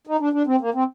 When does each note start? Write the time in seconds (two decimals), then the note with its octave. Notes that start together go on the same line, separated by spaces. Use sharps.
0.07 D#4
0.20 D4
0.33 D4
0.47 C4
0.61 A#3
0.74 C4